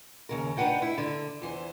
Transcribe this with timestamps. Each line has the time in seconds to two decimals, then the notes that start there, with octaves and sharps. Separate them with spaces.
0.29 D#2 C#3 A#4
0.57 D4 D#4 B4 F#5 G5
0.82 E4
0.98 D3
1.42 E2 E3 C5